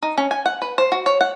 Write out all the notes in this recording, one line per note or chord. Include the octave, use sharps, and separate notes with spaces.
D#4
C#4
G#5
F#5
B4
C5
F#4
C#5
F#5